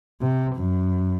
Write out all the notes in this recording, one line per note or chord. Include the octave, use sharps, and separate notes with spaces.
C3
F#2